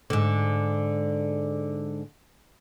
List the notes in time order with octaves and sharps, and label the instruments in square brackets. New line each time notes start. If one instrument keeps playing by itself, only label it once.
[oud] G#2 D3